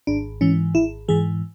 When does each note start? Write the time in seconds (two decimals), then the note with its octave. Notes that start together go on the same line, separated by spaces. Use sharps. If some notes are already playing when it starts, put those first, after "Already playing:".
0.07 G#1 D4
0.41 G#2 E3 C#4
0.74 G#1 E4
1.08 G#2 E3 G#4